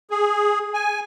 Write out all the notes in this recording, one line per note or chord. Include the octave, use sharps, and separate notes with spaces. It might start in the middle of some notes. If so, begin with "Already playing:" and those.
G#4
G#5